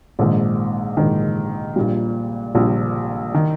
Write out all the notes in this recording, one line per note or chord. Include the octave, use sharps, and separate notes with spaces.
A#1 G#2 D#3
A#1 G#2 D#3
A#1 A#2 G3
A#1 A#2 G3
D#3